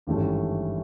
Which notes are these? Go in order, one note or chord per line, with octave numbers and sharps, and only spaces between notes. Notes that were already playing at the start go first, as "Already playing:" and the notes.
G#1 G2 E3 A3 C#4